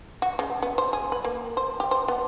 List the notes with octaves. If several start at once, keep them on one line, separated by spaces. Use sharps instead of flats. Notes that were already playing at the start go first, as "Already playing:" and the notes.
F#4
C#3
B3
C5
G#4
B4
A#3
C5
G4
C5
B3